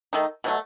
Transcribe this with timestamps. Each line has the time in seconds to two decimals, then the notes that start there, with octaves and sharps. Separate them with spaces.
0.13 D#3 A3 D#4
0.44 B2 F#3 A3